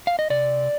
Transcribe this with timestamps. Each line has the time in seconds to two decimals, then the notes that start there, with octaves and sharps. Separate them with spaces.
0.07 F5
0.19 D#5
0.30 C3 D5